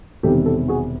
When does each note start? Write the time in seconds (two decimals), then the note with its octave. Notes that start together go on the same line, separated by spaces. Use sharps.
0.23 E1 E2 C3 D#3 G3 G4 A4
0.46 G4 A4
0.68 F#4 G#4